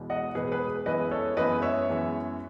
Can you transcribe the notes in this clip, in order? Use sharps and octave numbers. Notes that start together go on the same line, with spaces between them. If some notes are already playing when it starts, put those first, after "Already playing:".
Already playing: E1 E2 B2 G#3
D#5 F#5
E1 E2 B2 G#3 G#4 B4
G#4 B4
F#2 E3 G#3 B3 B4 D#5
A4 C#5
F#2 E3 G#3 B3 B4 D#5
C#5 E5
F#2 E3 G#3 B3